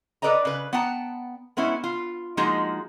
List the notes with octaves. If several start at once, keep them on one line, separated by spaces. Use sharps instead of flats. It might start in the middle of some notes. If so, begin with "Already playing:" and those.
A4 B4 D5 D#5 A#5
C#3 B4
B3 F#5 G5 A5 A#5
G#3 B3 C#4 E4
F4
F3 G#3 A#3 D#4 F4 F#4